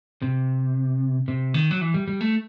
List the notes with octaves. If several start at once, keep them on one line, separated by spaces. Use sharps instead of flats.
C3
C3
D#3
F#3
E3
G3
G3
A3